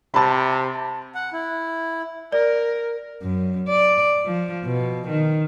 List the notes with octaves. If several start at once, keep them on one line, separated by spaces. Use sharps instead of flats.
C3 A5 B5
F#5
E4
A#4 D5
F#2
D5
F3
B2
D#3